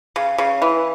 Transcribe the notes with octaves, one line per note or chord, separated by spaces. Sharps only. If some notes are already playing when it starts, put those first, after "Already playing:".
C#3
C#3
E3